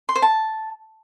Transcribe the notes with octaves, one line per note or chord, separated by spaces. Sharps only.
C6
C5
A5